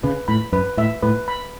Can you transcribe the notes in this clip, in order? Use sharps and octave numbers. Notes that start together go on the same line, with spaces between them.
C#3 B4
A2 B5
F#2 B4
A2 E5
A2 B4
B5